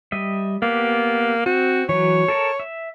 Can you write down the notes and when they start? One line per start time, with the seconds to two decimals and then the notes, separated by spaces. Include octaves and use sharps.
0.12 G3 D#5 E5
0.62 A#3 B3 G4
1.46 C4 F#4
1.89 E3 F#3 C#5
2.28 A4 A#4 A5
2.60 E5